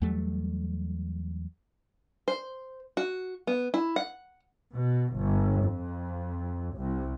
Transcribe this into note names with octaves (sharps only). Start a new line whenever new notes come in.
E2 F#3 G3 A3
C5
F#4
B3
E4
F#5
B2
G1
F2
C2